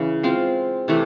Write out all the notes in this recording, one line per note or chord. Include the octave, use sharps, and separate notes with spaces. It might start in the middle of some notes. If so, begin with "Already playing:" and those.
Already playing: C#3 E3
G#3 C4 F4
C3 E3 A3